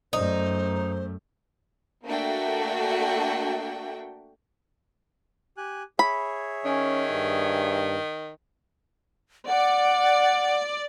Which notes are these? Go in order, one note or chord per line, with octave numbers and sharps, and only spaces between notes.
F#2 A3 D#4 C5
A3 A#3 D4 F#4 E5 G5
G4 G#5 F#6
G#4 C#5 E5 B5
D#3 C#4
G2
D5 F#5